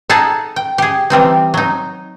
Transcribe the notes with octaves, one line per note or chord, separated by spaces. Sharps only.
D#4 G#4 A4 F#5 A5 A#5
G5
G4 G#4
E3 G3 C4 D#4
F#3 D#4